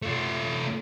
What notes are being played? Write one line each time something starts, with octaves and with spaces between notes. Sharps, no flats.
A3 F4